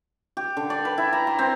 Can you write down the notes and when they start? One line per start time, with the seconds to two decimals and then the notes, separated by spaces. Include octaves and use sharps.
0.37 G4
0.57 D3
0.70 D5
0.85 B4
0.98 E4
1.13 A#5
1.27 C6
1.39 C4